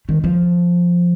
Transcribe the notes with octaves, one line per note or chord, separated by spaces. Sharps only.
D#3
F3